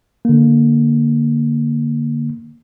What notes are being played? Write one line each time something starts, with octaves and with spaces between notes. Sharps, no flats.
D3 A#3